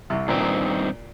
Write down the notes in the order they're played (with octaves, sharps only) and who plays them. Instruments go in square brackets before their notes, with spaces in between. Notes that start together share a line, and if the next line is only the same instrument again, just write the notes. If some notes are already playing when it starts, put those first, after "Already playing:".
[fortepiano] C2 C3
[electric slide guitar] G2 D#3 C4 [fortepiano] A#2